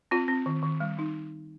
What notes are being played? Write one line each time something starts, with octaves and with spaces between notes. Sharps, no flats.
C4 F4
C4
D#3
D#3
G3
D#4